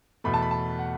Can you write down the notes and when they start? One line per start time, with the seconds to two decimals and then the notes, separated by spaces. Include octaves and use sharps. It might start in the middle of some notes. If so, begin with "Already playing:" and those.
0.24 E2 B2 A3 B5
0.34 A5
0.42 B5
0.51 A5
0.79 F#5